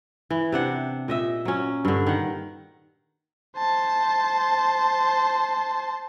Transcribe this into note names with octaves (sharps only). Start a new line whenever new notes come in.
E3
C3 D4 F#5
A#2 D#5 E5
F#3 C#4
G2 D3
D#3 F#5
C5 A5